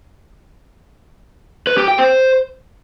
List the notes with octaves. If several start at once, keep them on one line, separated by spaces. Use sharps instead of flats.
B4
G4
G5
C5